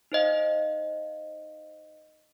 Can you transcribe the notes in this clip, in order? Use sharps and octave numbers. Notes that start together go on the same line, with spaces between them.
D#4 C5 D#5 F5